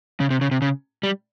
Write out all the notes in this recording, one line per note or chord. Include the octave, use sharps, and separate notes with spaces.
C#3
C3
C#3
C3
C#3
G3